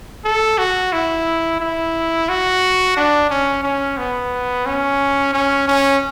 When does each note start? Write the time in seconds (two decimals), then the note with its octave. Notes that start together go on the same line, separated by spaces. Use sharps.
0.24 A4
0.58 F#4
0.92 E4
1.60 E4
2.29 F#4
2.96 D4
3.30 C#4
3.63 C#4
3.97 B3
4.66 C#4
5.33 C#4
5.68 C#4